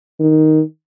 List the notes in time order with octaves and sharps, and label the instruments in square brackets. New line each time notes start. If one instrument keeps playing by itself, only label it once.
[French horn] D#3